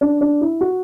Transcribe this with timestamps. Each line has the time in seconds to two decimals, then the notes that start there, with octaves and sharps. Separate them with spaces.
0.01 D4
0.21 D4
0.41 E4
0.61 F#4